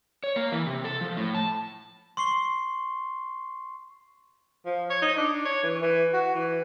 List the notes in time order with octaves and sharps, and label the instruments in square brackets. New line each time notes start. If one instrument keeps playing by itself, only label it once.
[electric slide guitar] C#5
A#3
E3
C3
A4
F3
A2
A5
[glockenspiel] C6 C#6 C7 G7
[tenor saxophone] F3
C#5
D#4
D4
C#5
E3
E3
F#4
E3